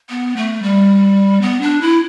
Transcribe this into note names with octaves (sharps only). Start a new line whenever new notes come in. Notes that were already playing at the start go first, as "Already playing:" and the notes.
B3
A3
G3
B3
D4
E4